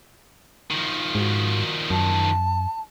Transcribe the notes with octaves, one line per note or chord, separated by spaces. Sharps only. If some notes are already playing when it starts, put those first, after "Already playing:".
D#3 F3
G#2 F#4
F#2 A5